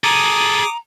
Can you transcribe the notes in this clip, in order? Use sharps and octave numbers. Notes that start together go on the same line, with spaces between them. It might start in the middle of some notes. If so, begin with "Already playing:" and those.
G#4 A4 A#5 D6 D#6